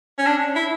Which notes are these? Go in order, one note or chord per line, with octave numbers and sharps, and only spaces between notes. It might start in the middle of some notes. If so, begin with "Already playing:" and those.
C#4
D4
E4